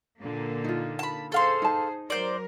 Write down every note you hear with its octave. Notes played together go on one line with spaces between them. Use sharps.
A#2 D3 A#3
D#4 F4
A5 B5
G#4 A4 C5 F5 C6
D#4 A5
F#3 A#4 C5 D5